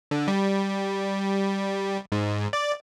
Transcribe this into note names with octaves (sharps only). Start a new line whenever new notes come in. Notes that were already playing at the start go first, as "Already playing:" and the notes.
D3
G3
G#2
D5